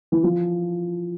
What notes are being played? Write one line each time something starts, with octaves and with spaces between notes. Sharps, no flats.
E3
F3